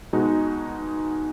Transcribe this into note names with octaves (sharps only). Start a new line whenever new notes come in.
B2 G#3 D#4 F#4